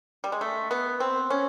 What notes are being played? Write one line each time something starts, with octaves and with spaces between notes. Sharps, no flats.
G3
G#3
A3
B3
C4
C#4